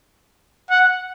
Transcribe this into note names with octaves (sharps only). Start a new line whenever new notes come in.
F#5